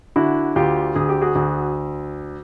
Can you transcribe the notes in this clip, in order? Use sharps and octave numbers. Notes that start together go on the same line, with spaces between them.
D3 E4 F#4
D2 F4 G4
D2 G#4
G4
F#4 G#4
D2